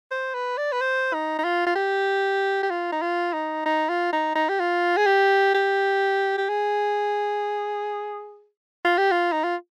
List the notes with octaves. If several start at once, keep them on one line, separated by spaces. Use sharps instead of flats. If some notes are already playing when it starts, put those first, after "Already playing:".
C5
B4
D5
B4
C5
D#4
D#4
F4
F4
G4
G4
F4
D#4
F4
D#4
D#4
F4
D#4
D#4
G4
F4
G#4
G4
G4
G4
G#4
F4
G4
F4
D#4
F4